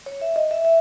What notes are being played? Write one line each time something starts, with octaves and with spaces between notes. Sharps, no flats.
C#5
E5
D#5
E5
E5